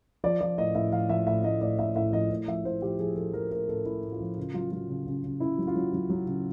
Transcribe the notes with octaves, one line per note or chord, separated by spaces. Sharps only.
F3 D5
F3 D5
A2 D#5
A2 E5
F3 F5
F3 E5
A2 E5
A2 D#5
A2 D5
A2 E5
A2 E5
F3 D#5
A2
F3 E5
A2 C5
F3 G4
F3 G#4
F3 A4
F3 A#4
A2 A#4
A2 A4
A2 E4
A2
F4
F3
C#3 F4
F#3 F4
F#3 F4
C#3
C#3
C#3
C#3 E4
F#3
F4
F#3
F#3
F#3
C#3